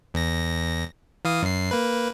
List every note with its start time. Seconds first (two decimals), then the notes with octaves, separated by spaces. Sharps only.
0.14 E2 A#6
1.25 E3 F5 D#6
1.42 F#2 C7
1.71 A#3 B4